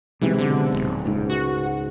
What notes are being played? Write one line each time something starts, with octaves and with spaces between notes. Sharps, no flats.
B1 G#2 C3 E3
D3
D#1
C#2 G#2
F#4